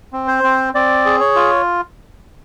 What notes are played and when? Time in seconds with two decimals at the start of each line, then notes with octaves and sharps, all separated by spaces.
0.13 C4
0.28 C5
0.44 C4
0.75 C4 D5
1.05 G#4
1.20 C#5
1.36 F4